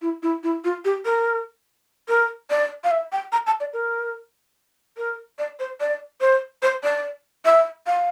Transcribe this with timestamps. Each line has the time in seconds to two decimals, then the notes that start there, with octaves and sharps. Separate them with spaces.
0.02 E4
0.23 E4
0.43 E4
0.64 F4
0.85 G4
1.05 A#4
2.08 A#4
2.50 D5
2.84 F5
2.91 E5
3.12 G5
3.32 A#5
3.47 A5
3.60 D5
3.73 A#4
4.97 A#4
5.39 D5
5.59 C5
5.80 D5
6.21 C5
6.62 C5
6.83 D5
7.45 E5
7.87 F5